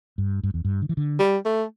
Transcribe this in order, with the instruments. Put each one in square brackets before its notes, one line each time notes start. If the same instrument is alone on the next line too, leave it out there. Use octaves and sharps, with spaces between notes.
[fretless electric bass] G2
G2
E2
G2
D3
E3
D3
[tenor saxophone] G3
A3